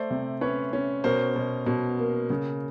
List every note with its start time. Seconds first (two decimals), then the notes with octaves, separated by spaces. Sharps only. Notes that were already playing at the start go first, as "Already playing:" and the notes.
Already playing: A3 C5 D5
0.11 C3
0.41 C#4 B4 C#5
0.73 C#4
1.04 B2 A#4 C5
1.36 B2
1.67 B2
1.99 A#3
2.30 C#3